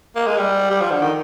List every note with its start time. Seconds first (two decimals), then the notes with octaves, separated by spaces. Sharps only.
0.16 A#3
0.27 G#3
0.38 G3
0.70 G3
0.81 F3
0.91 D3
1.02 D#3